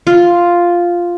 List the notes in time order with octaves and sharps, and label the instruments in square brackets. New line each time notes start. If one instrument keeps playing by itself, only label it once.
[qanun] F4